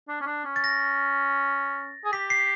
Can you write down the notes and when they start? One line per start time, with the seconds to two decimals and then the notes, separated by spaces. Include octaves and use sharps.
0.08 D4
0.21 C#4
0.26 D4
0.45 C#4
0.56 A6
0.64 A#6
2.05 G#4
2.13 G4 B6
2.30 C7